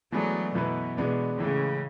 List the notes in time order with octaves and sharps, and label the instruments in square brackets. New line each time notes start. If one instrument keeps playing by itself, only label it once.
[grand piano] E3 G#3 B3 D4 G#4 [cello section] F#3 A3
[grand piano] F#2 E3 B3 E4 B4 [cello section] B2
[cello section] B2 [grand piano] E3 G#3 B3 D4
[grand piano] A2 E3 G#3 [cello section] C#3